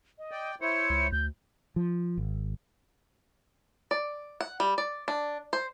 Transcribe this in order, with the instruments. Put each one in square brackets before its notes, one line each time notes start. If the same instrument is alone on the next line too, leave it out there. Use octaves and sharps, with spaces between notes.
[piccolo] D#5
[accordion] D5 G5
[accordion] E4 C5 C#5 [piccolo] C#7
[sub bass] C#2
[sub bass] D2 [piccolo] G6
[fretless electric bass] F3
G#1
[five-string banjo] D5
F#5
G3
D5
D4
C5